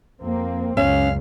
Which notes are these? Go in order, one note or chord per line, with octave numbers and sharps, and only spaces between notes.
F2 A#3 C4
C#2 F#2 C#4 F5